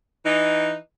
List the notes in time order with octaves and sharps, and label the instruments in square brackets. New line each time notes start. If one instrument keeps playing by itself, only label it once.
[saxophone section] E3 D#4